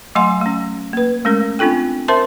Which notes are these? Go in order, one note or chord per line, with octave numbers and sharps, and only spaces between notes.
F#3 A3 D#5 F#5 G#5 C6
A3 C#4
A#3 B4
G#3 A3 C#4 A#4
C4 D4 F4 A4 G5
A#4 C5 E5 A5 C6